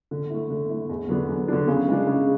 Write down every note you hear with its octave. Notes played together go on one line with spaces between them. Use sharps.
D3
A3 E4
D3
A3 E4
E2
D3 F#3 B3 D4
E2
D3 F#3 B3 D4
C#3
G#3 D4
C#3